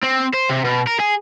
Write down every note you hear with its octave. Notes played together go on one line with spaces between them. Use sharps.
C4
C5
C3
B2
A#4
G#4